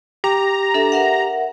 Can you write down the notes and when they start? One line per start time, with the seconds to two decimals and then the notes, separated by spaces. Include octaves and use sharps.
0.24 G4 A#5
0.74 D4 A4 E5
0.92 A#4 E5 F#5